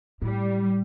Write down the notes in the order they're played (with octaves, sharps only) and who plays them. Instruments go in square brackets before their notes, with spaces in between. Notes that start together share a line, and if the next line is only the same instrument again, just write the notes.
[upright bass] A2 [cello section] G3